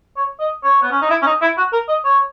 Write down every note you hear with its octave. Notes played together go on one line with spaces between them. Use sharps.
C#5
D#5
C#5
B3
C#4
D#4
E4
C#4
D#4
E4
F#4
A#4
D#5
C#5